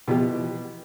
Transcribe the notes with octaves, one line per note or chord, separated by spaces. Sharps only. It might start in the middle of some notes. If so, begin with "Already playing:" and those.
B2 E3 F3 B3 G4